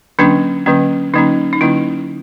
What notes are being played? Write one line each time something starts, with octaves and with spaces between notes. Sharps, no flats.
D3 F#3 A#3 C#4 D4
D3 F#3 A#3 C#4
D3 F#3 A#3 C#4 D#4
D#4
D3 F#3 A#3 C#4 E4